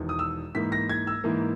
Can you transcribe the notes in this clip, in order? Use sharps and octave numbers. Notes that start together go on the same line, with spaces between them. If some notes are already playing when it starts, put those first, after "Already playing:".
Already playing: E1 E2 D#3
D#6
E6
G#2 E3 A#3 B6
A#6
G#6
E6
G#2 E3 A#3